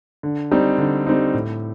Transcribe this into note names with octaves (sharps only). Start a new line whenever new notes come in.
D3
G3 C4 D#4
D3
G3 C4 D#4
A2